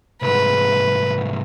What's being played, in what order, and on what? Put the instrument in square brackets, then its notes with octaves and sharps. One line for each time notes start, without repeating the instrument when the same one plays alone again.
[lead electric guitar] C2 G#2 [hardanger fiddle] B4